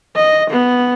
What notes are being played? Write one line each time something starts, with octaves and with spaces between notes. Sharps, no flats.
D#5
B3